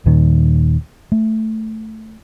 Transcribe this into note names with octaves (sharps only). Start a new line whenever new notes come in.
D#2 A#2 D#3
A3